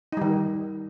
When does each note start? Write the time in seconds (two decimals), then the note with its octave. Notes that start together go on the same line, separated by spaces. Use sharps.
0.13 D#4
0.17 G3
0.21 D#3